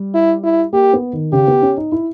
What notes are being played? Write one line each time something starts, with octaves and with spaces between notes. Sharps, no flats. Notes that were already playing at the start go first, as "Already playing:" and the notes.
Already playing: G3
E4
E4
A#3 G4
B3
D#3
C#3 G4
B3
C#4
D#4
E4